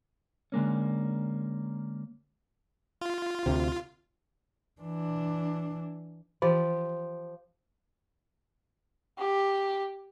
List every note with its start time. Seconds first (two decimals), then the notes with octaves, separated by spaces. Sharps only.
0.52 D3 G#3 A#3 C#4
3.01 F4
3.46 D2 C3
4.81 E3 D4
6.42 E3 F3 G4 D5
9.18 G4